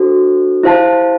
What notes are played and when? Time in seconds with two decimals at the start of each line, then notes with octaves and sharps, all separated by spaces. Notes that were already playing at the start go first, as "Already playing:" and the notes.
Already playing: D4 F#4 A4 C5
0.63 E4 G4 C5 F5 A5